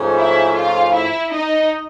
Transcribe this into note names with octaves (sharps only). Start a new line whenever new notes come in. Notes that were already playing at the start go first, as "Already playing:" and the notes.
Already playing: G#2 F3 A3 C#4
E4 E5
F4 F5
E4 E5
D#4 D#5